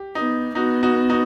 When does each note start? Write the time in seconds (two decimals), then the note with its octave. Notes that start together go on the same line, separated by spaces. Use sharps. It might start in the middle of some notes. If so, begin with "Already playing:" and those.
Already playing: G4
0.15 B3 D#4
0.55 B3 D#4 F#4
0.83 D#4 F#4
1.09 D#4 F#4